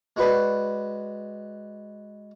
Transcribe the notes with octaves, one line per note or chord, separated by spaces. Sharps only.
G#3 F#4 B4 D5